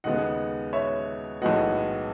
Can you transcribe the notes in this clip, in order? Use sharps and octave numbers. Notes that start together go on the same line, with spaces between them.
D#2 C#3 G#3 B3 D#5 F#5
C#5 E5
B1 A2 E3 G#3 B3 D#5 F#5